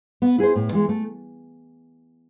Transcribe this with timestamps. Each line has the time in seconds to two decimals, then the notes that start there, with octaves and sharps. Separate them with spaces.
0.22 B3
0.38 E4 G#4 C5
0.55 A2
0.72 E3 G#3
0.89 A3